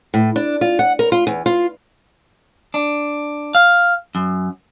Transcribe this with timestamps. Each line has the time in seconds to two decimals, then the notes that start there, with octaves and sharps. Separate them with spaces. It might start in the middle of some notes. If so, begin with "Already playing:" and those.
0.14 A2
0.36 D4
0.61 F4
0.79 F#5
0.99 A#4
1.12 F4
1.27 E2
1.46 F4
2.74 D4
3.55 F5
4.15 F#2